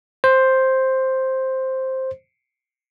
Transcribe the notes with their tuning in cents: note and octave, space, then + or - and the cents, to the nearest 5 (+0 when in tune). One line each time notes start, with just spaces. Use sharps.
C5 +5